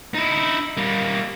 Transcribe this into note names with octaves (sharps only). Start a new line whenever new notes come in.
D#4 E4
G3 A#3